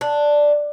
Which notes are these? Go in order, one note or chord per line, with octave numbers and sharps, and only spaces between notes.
D4